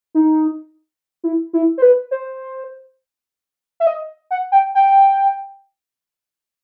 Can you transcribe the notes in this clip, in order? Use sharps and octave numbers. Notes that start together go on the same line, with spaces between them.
D#4
E4
E4
C5
B4
C5
E5
D#5
F#5
G5
G5